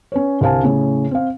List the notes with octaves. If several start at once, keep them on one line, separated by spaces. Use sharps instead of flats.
C#4 B4 C#5
C2 D3 C5 F5 G#5 A5
A2 C#3 C#4
C4 F5